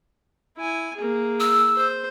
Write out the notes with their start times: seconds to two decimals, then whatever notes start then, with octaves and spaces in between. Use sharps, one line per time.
0.57 E4 G#5
0.96 A#3 G#4
1.40 E6
1.76 C5